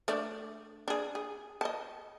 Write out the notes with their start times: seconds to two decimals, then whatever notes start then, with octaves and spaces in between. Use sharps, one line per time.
0.08 A3 D4 D5
0.88 D4 G#4
1.15 G#4
1.61 D#5 A5